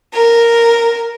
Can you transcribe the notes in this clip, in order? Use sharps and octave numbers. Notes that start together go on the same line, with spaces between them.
A#4